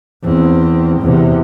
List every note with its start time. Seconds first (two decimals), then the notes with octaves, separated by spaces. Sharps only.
0.24 E2 C4
1.01 E2 C3